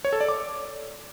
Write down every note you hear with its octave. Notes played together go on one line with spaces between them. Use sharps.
C#5
A4
D5
D6